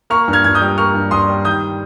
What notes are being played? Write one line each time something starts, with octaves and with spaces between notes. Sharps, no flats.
A#3 C#6 F6
G2
F6 G#6
G2 G#6
D#6 G6
G3
A#3 C#6 F6
G2
G2 C6 D#6
G3
D#3 D#6 G6